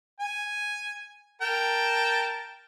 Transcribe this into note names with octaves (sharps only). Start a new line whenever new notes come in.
G#5
A#4 G5 A5